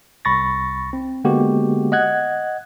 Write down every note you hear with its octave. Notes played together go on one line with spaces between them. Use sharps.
C2 B5 C#6 A6 A#6
C4
D3 G#3 A#3 B3 F#4 G4
D#5 F#5 F#6 G#6